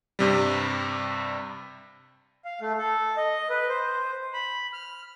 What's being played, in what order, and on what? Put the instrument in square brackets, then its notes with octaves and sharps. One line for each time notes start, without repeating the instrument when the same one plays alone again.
[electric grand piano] G2 C3 G3
[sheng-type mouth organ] F5
A3
A4
D#5
B4
C5
B5
F6